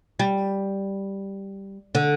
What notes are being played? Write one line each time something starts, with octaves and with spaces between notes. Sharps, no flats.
G3
D3